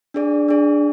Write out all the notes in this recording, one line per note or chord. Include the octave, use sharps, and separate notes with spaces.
D4 G#4 D5
D4 G#4 D5